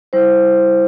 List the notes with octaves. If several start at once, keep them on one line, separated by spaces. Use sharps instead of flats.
G3 E4 C5